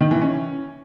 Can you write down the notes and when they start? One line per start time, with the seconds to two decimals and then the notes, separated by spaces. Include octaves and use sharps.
0.01 D#3
0.11 E3
0.22 C#4